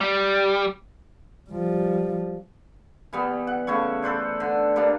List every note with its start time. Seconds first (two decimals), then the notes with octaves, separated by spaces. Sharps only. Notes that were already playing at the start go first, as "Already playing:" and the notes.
0.01 G3
1.51 F3 G3
3.13 E3 G3 B3
3.47 F#5
3.67 C#3 A3 E4 C#6
4.02 A4 B4 C5 D5
4.40 D3
4.76 G3 A#3 D4